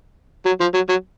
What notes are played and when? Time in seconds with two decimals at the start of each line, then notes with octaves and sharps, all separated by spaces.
0.46 F#3
0.61 F3
0.74 F#3
0.89 F#3